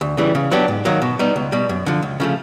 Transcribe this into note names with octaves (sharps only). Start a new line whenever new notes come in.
D2
C#3 E3 G3
C#3
F#3 B3 D4 G4
G#2
D#3 F#3 A#3
B2
G3 B3 D#4
C#2
B2 G3
F#2
D3 F3
C#2
C#3 F3 A3